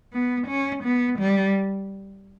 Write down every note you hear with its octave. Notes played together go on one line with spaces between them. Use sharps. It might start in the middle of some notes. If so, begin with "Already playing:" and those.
B3
C#4
B3
G3